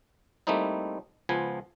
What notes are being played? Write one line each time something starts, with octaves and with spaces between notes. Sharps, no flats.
G3 A3 A#3 C4 D#4 E4
C#2 F3 B3 G#5